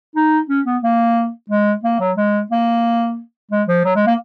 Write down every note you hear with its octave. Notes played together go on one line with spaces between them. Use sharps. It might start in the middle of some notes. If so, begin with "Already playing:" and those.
D#4
C#4
B3
A#3
G#3
A#3
F#3
G#3
A#3
G#3
F3
F#3
G#3
A#3